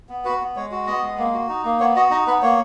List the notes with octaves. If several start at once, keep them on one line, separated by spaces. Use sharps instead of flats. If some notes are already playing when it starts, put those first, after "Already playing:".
B3
F#4 B4
B3
G#3 C#5
F#4
B3 D#5
G#3
A#3
F#4
D#4
A#3
B3 C#5
F#4 D#5
D#4 D#5
B3 B4
A#3 C#5